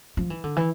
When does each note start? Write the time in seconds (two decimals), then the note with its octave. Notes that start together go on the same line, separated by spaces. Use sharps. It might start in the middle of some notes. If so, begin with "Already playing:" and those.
0.17 F3
0.30 E3
0.44 D3
0.56 E3